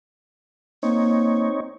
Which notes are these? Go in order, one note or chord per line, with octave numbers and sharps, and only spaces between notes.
A#3 C4 D#4 C#5